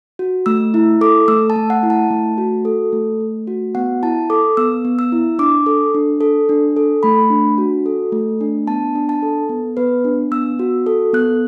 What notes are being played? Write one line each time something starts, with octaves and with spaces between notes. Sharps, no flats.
F#4
A3 E6
E4
A4 D6
A3 E6
A5
A3
F#5
E4
A5
A3
F#4
A4
A3
A3
F#4
B3 F#5
E4 A5
A4 D6
B3 E6
B3
E6
E4
D4 D6
A4
D4
A4
D4
A4
A3 B5
D4
F#4
A4
A3
D4
B3 A5
D4
A5
A4
B3
B3 B4
D4
B3 E6
F#4
A4
B3 F#6